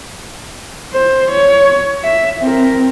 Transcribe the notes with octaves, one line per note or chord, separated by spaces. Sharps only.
C5
C#5
E5
C4 A#4